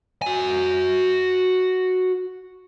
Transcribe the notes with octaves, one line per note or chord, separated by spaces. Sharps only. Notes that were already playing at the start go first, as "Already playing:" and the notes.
F#4 G#5